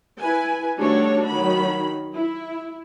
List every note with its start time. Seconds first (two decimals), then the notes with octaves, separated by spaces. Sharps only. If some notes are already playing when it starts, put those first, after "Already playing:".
0.20 E4 B4 G#5
0.79 D#3 G3 A3 D4 F#4 C#5
1.26 D#3 F#3 B5
2.13 E4